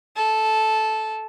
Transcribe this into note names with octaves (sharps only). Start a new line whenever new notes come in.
A4